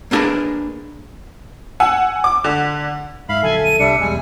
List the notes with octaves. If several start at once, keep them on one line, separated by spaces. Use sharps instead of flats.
A#3 B3 D4 G#4 A#4 B4
F#5 G#5 E6
D6
D3
G#2 E5 F5 B5
A#1 D3 F#3 A4 G#5
D#7
C2 G3 D4 E5 C#7
E1 B1 E2 G3 G#3 G#5